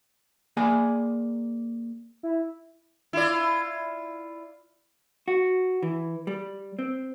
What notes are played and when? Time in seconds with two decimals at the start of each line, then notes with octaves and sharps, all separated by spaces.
0.57 A#3 G#4 D5 G#5
2.23 E4
3.13 E4 F4 D5
5.28 F#4
5.83 E3
6.27 G3
6.79 C4